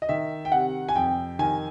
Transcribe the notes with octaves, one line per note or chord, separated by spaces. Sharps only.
D#5
D#3 E5
G5
C3 F#5
G#5
F2 G5
D#3 G#5